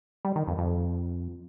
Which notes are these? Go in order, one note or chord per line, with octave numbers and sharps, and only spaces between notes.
G3
D#3
F2
F2